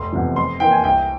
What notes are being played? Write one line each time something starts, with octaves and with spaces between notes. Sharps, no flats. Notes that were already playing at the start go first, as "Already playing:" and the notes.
Already playing: F1 C6
E2 C3 F3
F2 C6
E3 A#3 G5
G#5
C2 G5